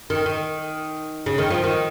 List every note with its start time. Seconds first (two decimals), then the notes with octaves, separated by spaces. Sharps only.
0.10 D#3
0.26 D#3
1.26 C#3
1.38 D#3
1.50 F3
1.64 D#3